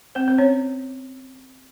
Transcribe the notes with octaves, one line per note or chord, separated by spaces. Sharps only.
C4 C5
C4 C5
C#4 C#5